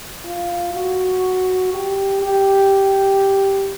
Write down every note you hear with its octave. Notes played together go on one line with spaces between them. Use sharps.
F4
F#4
G4
G4